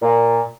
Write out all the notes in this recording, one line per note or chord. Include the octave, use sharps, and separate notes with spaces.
A#2